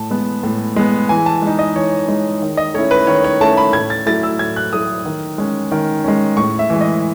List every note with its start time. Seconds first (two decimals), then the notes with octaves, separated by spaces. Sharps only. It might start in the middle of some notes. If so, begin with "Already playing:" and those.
Already playing: A2 A5
0.11 G#3 B3
0.43 A2
0.76 G#3 B3
1.09 E3 G#5
1.26 A5
1.42 G#3 D#4
1.59 D#5
1.76 E3 C#5
2.08 G#3 D#4
2.42 D#3
2.57 D#5
2.74 A3 C#4 E4 C#5
2.91 B4
3.07 D#3 C#5
3.24 C#5
3.41 A3 C#4 E4 A5
3.57 B5
3.73 A2 G#6
3.90 A6
4.06 F#3 A3 E4 A6
4.23 E6
4.39 A2 G#6
4.56 F#6
4.72 F#3 A3 E4 D#6
5.05 D#3
5.38 G#3 C#4
5.71 D#3
6.04 G#3 C#4
6.37 A2 C#6
6.59 E5
6.70 E3 G#3
6.81 D#5